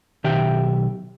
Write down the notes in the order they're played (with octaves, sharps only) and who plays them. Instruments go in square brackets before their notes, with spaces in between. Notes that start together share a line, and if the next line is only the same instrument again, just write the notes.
[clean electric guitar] B1 D#3 G4 E5 G5